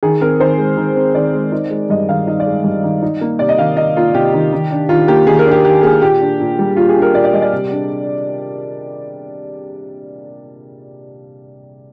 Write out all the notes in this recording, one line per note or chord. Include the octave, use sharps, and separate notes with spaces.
D#3 G#4
C4 A#4
D#3 C5
G#3
D#3
C4
D#3 D5
G#3
D#4
G#3
G2 D#5
D#3 F5
D#4 D#5
D5
G#3
G2
D#3
D#4
A#3
C3 D5
D#5
D#3 F5
D#4 D#5
A#3 F4
C3 G4
D#3
D#3
D4
D#3 F4
A#3 G4
D#3 G#4
A#4
D4
G4
D#3 G4
A#3 G#4
A#2 G4
D4
A#2
G3
A#2 F4
G#4
D4
A#4
A#2 D5
D5
G3 D#5
D5
C3
D4